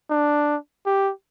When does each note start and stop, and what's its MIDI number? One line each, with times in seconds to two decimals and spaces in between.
0.10 0.57 62
0.86 1.12 67